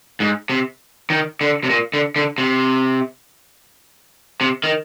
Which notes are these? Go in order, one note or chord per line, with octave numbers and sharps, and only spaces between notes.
G#2
C3
D#3
D3
C3
A#2
D3
D3
C3
C3
D#3